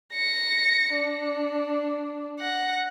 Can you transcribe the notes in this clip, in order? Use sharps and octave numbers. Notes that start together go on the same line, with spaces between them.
A#6 C#7
D4
F#5 A#6